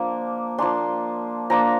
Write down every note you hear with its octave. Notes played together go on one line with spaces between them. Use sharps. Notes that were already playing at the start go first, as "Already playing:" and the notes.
Already playing: F3 A#3 D4
F3 A#3 D4 C6
F3 A#3 D4 A#5